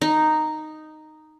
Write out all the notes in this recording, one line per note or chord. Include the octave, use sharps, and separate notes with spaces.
D#4